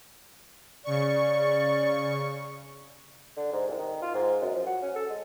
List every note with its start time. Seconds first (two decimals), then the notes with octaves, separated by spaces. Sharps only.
0.84 C#3 D5 C#6
3.37 D3
3.53 G#2
3.67 C2
3.79 D#3
4.02 F4
4.15 G#2
4.42 F#2
4.55 F3
4.67 F#4
4.83 C#4
4.96 A4
5.10 G#3